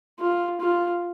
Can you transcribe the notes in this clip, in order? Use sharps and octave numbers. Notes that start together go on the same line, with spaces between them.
F4
F4